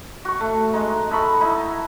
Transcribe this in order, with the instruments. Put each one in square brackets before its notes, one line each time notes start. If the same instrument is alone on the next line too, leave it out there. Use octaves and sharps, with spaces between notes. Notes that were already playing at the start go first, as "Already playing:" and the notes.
[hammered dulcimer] F#4 C#6
A3
G#3 D#4
D#4 A4 B5 C#6
D#4 E4